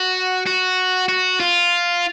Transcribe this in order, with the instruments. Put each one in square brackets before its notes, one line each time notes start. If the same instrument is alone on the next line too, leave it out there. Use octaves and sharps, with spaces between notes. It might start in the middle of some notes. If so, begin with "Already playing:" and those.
Already playing: [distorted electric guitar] F#4
F#4
F#4
F4